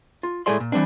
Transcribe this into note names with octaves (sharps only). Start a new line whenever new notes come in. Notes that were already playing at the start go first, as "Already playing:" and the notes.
F4
A2 G#3 A3 G#4 D5 C6
A#2
E3 G3 C4 D4